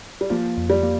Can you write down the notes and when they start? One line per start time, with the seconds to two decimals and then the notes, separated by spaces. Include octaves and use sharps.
0.21 G3
0.30 F3 A#3
0.57 F2
0.70 G3
0.83 A#3